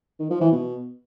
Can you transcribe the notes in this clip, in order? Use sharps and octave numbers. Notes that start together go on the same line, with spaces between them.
D#3
F3
E3
B2